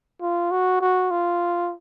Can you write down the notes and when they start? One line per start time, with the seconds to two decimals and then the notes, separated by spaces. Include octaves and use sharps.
0.21 F4
0.51 F#4
0.81 F#4
1.11 F4